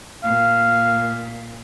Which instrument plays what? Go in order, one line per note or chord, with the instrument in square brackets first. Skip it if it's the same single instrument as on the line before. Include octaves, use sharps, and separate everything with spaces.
[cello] A#2 [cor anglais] F5